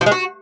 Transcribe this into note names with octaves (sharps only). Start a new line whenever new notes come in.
F3
G#3
F#4